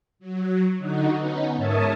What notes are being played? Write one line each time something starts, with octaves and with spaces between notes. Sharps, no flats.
F#3
D3 D#4 F#4
B3 C#4 D#4
G#2 A#4 C#5 E5 A5 D#6